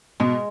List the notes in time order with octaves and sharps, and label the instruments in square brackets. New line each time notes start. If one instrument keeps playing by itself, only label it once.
[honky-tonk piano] B2 [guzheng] G#3